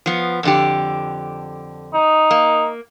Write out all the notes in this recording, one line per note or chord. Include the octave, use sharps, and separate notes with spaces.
F3 B3
F2 D3 G4
D#4
A#3